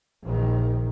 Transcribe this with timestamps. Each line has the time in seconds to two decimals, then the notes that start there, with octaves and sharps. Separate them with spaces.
0.23 A#1 D#3